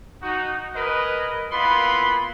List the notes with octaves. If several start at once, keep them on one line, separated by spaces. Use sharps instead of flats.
D#4 F#4
G#4 A#4 B4 D#5
A#3 B3 E4 F4 B5 C6